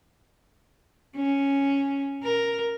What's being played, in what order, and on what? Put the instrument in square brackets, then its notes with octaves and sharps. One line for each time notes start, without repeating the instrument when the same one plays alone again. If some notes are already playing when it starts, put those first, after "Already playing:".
[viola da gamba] C#4
A#4